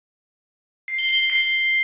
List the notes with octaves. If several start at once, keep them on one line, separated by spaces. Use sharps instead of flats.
C7
G7
G7
G7
C7